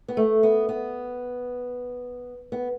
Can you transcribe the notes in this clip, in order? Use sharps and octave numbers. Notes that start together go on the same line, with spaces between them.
B3
A3
B3
B3
B3